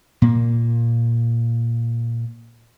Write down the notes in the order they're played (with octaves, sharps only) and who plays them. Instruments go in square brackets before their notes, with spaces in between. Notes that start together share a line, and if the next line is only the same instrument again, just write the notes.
[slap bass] A#2 A#3